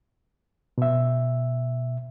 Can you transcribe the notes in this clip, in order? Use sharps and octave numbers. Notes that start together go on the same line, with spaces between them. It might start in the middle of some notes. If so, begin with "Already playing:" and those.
B2 E5